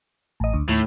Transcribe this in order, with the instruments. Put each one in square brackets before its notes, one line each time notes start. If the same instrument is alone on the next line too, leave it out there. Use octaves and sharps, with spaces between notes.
[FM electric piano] A1 D#5
D2
[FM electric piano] D#2 [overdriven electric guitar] A2